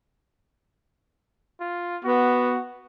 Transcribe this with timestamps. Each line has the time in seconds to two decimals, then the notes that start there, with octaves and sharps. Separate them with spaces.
1.60 F4
2.05 B3 F#4